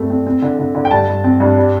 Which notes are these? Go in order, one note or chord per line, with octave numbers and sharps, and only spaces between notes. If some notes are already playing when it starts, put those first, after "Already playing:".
Already playing: G2 A3 C4
C4
C4
D3
D3
D3
G5
G2 A5
G2
C4
G2
G3